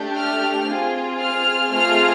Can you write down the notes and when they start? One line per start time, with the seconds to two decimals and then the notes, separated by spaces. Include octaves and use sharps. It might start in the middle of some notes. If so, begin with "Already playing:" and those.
Already playing: A3 D4 G4
0.18 F6
0.69 C4 F4 G#4
1.20 F6
1.71 A3 C4 F4 G#4 F6